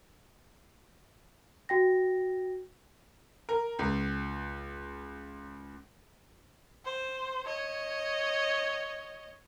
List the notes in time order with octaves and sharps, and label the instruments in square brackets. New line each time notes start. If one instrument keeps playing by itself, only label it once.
[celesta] F#4 G5 A#6
[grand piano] A#4
C#2
[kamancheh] C5
C#5 D#5